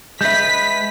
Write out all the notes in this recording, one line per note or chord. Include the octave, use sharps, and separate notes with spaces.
G#3 B4 E5 G6 B6